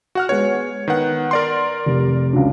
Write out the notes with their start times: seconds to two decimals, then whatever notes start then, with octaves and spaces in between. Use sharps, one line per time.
0.15 F#4 F#5 F6
0.29 G#3 B3 C#5
0.88 D#3 B3 F#5
1.31 A#4 D5 C6
1.86 F1
2.33 C#2 F#3 D4